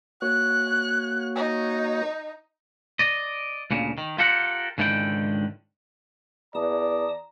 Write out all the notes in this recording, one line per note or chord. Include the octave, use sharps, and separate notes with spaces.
A#3 F#4 C#5 F#6
D#4
D5 D#5
D2 A#2 C#3
D#3
F4 G4 A4 A#4 F#5
C#2 G#2 D3 D#3 E4 G5
E2 D5 A5 A#5 D#6